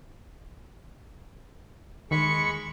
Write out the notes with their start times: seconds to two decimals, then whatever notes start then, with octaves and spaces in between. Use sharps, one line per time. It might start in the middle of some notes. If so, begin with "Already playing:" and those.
2.11 D#2 G#3 B5 C#6 C#7